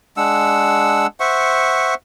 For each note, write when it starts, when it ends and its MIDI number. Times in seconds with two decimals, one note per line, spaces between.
0.17 1.07 56
0.17 1.07 62
0.17 1.07 78
0.17 1.07 88
1.20 1.94 72
1.20 1.94 76
1.20 1.94 78
1.20 1.94 85